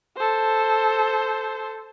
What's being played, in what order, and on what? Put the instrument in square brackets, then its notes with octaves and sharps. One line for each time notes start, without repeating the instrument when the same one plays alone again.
[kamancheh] A4 C5